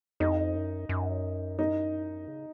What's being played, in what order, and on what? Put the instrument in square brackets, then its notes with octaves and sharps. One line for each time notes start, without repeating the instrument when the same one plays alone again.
[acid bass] F2 [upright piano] D#4
[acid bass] F#2
F#2
[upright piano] D#4
[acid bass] C#3